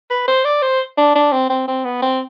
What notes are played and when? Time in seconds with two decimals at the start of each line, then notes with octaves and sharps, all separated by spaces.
0.11 B4
0.28 C5
0.45 D5
0.62 C5
0.98 D4
1.15 D4
1.33 C4
1.50 C4
1.68 C4
1.85 B3
2.02 C4